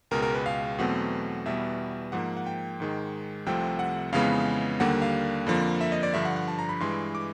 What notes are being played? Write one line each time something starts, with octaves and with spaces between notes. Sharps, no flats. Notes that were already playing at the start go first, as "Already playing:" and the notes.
C#2 B2 G#3 A#4
A#4
B4
F5
E2 B2 F#3 A3 C4 F#5
E2 B2 G3 B3 E5
G#2 F3 A#3 F#5
F#5
G5
G#2 D#3 G#3
C2 C3 F3 A3 C4 G5
F#5
F2 C#3 E3 G#3 B3 F5
D#2 D3 G3 A#3 F#5
F5
F2 D3 F3 A#3
E5
D#5
D5
G2 D3 F3 E5
F#5
F#5
A5
A#5
B5
G2 E3 G#3 C6
D6